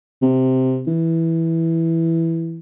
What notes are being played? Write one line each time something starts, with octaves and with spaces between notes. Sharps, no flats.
C3
E3